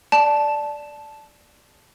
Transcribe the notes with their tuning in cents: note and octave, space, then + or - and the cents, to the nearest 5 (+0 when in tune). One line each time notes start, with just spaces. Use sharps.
D5 +0 A5 -10